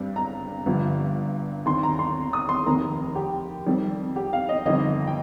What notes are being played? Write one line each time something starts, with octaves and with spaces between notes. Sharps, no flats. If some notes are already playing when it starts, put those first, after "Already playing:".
Already playing: G2 G3 C4
A#5
G1 G2 F3
D#2 D#3 C4 C6
A#5
C6
D#6
C6
F1 D#2 D#3 A#3 A#5
G4
F2 D#3 G3 C4
G4
F5
D#5
G1 F2 D#3 C4 D#5
G5